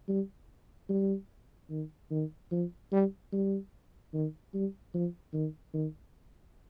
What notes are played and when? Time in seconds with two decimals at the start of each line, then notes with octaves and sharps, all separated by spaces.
0.08 G3
0.90 G3
1.70 D#3
2.11 D#3
2.52 F3
2.92 G3
3.32 G3
4.13 D#3
4.54 G3
4.94 F3
5.34 D#3
5.74 D#3